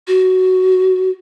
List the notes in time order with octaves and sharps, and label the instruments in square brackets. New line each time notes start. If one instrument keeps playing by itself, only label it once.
[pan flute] F#4